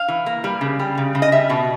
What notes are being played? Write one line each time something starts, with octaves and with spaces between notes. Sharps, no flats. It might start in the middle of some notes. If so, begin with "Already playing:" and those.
Already playing: F5
E3
A#3
G3
C#3
G3
C#3
C#3
D#5
G3 E5
B2